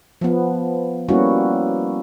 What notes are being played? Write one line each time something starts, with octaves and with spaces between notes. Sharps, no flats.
F3 B3
G3 A#3 B3 C#4 E4 F#4